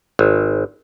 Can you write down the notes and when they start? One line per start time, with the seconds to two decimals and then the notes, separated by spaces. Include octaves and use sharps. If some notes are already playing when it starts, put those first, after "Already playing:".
0.19 G#1